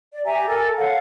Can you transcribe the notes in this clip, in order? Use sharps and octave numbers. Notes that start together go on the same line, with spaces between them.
D5
G4 E5 G#5 A#5
A4 A#4 G#5
A4 C#5 F5 F#5